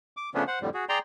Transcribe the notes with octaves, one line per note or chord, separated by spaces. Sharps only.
D6
C#3 F3 A3 B3 C#4 D4
C5 F#5
F2 A2 D3 G3
F#4 G#4
G#4 D5 G5 A#5 C6